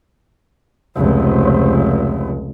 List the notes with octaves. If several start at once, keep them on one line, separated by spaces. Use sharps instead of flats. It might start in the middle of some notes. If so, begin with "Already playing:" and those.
F1 C#2